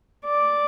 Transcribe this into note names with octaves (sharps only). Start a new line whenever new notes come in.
D5